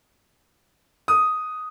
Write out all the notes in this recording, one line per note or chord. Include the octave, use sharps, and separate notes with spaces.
D#6